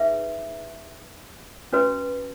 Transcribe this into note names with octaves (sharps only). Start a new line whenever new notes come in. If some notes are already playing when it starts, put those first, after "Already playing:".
Already playing: D#4 G#4 B4 E5
C#4 F#4 B4